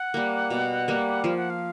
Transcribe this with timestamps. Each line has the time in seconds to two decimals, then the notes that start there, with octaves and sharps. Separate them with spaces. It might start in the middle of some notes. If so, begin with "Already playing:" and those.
Already playing: F#5
0.14 G3 A#3
0.50 B2
0.88 G3 A#3
1.24 F3 F5
1.37 F#5
1.50 F5